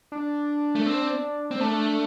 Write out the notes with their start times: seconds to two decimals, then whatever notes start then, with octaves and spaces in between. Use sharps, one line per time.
0.12 D4
0.75 A3
0.86 C4
1.51 C4
1.60 A3 D4